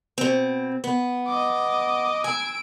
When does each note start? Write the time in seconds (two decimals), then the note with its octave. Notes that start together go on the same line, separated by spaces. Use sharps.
0.18 B2 C4
0.84 B3
1.27 D#5 D6
2.24 G#5 E6 D7